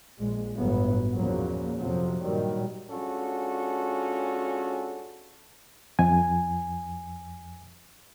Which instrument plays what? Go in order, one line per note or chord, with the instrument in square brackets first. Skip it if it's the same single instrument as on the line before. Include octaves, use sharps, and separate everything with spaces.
[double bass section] A#1 G#3
G1 A2 F#3 B3
E2 A#2 C#3 F3 F#3 A#3
F2 C3 F3 F#3
G2 A#2 D#3 F#3 G3
[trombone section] G#3 C#4 D4 F4 F#4 A4
[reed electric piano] F2 G#5